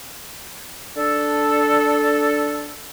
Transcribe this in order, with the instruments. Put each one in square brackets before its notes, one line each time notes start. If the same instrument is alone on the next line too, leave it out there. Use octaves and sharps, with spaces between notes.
[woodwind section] D4 A4